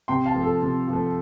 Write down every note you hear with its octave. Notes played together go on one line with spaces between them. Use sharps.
C3 G5 C6
F5 A5
F3 A3
A4
C3
F3
A3